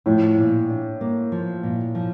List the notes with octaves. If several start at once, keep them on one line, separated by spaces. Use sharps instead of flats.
A2 F3
A#2
D4
A#3
F3
A#2
F3